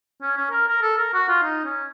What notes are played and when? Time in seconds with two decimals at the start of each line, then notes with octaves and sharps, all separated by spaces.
0.22 C#4
0.37 C#4
0.51 A#4
0.68 A#4
0.82 A4
0.98 A#4
1.14 F#4
1.29 F4
1.43 D#4
1.65 C#4